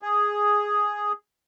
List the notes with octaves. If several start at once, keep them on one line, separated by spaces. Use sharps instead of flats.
G#4